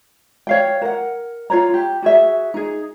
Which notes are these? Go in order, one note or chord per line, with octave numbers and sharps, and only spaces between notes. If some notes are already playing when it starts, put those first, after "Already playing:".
C#5 F5 G5
A#4 F#5
F4 A#4 C#5 A#5
G4
F#4 G#4 E5
D#4 G#4